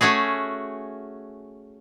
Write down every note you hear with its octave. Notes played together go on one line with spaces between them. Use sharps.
A3 C#4 F#4 G#4